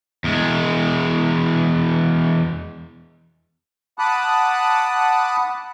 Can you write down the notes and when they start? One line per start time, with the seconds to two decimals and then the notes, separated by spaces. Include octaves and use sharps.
0.24 E2 G#3
3.99 F#5 A5 B5 D6 D#6 F#6